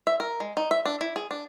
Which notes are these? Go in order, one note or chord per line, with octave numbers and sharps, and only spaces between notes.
E5
A#4
G#3
D#4
E5
D4
E4
G#4
D4